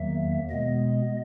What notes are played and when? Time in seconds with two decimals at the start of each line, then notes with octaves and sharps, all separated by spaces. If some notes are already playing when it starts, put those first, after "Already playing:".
Already playing: E2 D#3 F#3 A#3 E5
0.50 B2 G#3 B3 D#5